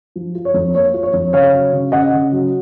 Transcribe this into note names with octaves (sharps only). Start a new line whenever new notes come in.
F3
F4
C#5
F2
A#3 C#5
F4
C#5
F2
C#3 C#5 F5
F#3
C#3
C#3 D#5 F#5
C#3
F#3